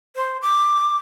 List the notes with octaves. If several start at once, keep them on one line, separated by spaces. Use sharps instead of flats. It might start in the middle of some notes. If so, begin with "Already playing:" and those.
C5
D6